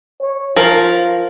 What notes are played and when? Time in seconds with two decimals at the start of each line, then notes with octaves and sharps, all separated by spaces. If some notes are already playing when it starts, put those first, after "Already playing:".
0.21 C#5
0.56 F3 F4 A#4